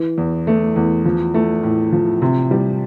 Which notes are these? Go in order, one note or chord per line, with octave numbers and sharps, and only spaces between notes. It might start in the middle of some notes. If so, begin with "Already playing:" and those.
Already playing: E3
E2
A3
E2
F3
A3
A2
F3
C3
G3